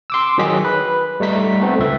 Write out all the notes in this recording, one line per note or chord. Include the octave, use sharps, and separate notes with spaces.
C6 D6 E6
D#3 F#3 G#4 D#5 B6
B4
G3 A3 D#4 B6
A3 B3 C4
C#2 E5